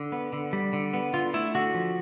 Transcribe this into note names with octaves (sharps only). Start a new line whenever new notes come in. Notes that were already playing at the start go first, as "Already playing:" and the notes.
Already playing: D3
B3
D3
G3
D3
B3
D3 F4
A3 E4
D3 F#4
F3